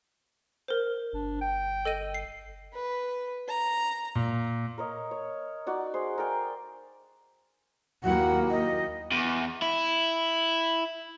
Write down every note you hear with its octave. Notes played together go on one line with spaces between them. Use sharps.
A#4 C5
G1 D4
G5
A4 D#5 D#7
C7
B4
A#5
A#2
A#4 C#5 D#5
C#5
D#4 F#4 D5
G#4 C5
A#4 D5 G5 G#5
D#2 F#3 A#3 E4 G4 F#5
D#5
E2
E4